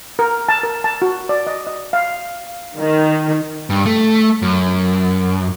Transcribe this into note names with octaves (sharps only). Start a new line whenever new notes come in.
A#4
A5
A#4
A5
F#4
D5
D#5
D#5
F5
D#3
G2
A3
F#2